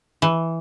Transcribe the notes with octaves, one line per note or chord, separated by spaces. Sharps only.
E3